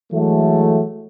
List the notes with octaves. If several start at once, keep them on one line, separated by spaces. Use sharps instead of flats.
E3 F#3 G#3 A3